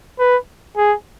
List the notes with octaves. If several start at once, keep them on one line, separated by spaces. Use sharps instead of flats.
B4
G#4